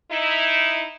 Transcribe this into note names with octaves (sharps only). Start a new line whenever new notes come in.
D#4 E4